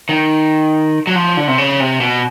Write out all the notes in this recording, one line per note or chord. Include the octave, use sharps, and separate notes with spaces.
D#3
F#3
F3
D3
C3
C#3
C3
B2